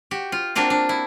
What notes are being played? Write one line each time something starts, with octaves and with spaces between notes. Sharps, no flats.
F#4 G4
F4
A#3 C4 D4 F4 F#4
D4
E4